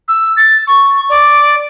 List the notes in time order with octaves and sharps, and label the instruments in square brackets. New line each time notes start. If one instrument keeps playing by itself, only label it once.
[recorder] E6
A6
C#6
D5